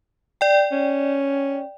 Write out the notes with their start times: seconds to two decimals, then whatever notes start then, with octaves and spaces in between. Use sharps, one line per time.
0.41 D5 G5
0.72 C#4